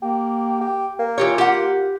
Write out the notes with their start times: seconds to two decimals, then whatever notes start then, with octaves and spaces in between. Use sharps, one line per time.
0.02 A#3 G4
0.61 G4
0.99 A#3
1.18 E3 F4 G4 C#5
1.38 G4 F#5